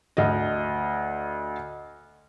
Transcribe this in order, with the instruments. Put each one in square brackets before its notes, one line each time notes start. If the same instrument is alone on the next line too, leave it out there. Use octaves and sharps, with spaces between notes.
[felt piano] D2 D#5